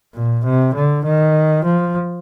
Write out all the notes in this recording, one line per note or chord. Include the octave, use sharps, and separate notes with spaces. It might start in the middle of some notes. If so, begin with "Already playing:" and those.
A#2
C3
D3
D#3
F3